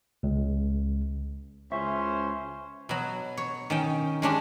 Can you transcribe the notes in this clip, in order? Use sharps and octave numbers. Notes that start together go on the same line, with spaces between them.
C#2
C#2 C#4 E4 C5 E5 C#6
B2 F#3
C#5
D#3 C#4 G5
G#3 C#4 D4 G4